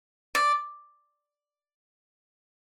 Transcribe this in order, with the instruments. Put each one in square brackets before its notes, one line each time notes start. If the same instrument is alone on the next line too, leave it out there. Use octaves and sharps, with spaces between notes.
[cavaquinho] D5